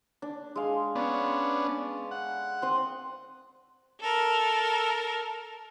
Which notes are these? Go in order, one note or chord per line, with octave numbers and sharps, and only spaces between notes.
D4
G#3 F5
B3 C#4 D4
F#5
C4 C6 D#6
A4 A#4